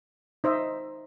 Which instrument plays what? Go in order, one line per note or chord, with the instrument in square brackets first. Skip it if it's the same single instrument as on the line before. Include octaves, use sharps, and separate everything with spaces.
[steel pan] D#4 C5 D#5 E5